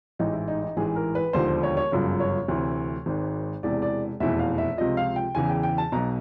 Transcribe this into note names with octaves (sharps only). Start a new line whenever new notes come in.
A1 G#2 E3 D#4
E4
D#4
D#4
A1 G#2 E3 G#4
A#4
B4
E1 D#2 D3 F3 C5
C5
C#5
C#5
G1 F#2 C#3 F3
C#5
D2 C3 E3
G#1 G#2 D#3
E1 E2 C3 D5
D5
F1 E2 B2 E5
F5
E5
C#2 C3 F3 D#5
F5
G5
E2 C#3 E3 G#5
G5
G5
A5
B1 B2 A#5